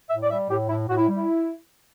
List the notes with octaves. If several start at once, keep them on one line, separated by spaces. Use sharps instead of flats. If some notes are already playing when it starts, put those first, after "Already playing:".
A2 E5
D5
G3 E5
A2 G4
A2 E4
A2 F#4
E4
G3
E4